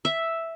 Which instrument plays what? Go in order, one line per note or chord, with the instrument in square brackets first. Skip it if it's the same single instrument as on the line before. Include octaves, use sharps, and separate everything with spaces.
[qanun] E5